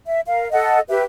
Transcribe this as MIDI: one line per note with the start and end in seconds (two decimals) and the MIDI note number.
0.06 0.21 76
0.27 0.47 70
0.27 0.47 77
0.51 0.80 69
0.51 0.80 75
0.51 0.80 78
0.89 1.03 67
0.89 1.03 71
0.89 1.03 76